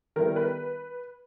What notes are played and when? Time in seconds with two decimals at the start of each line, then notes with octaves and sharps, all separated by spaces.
0.16 D#3 G3 B3 E4 A#4
0.36 B4